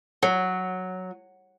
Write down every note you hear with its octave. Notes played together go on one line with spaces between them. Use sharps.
F#3